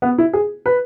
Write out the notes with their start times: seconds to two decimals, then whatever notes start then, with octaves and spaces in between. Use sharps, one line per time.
0.02 B3
0.18 E4
0.33 G#4
0.66 B4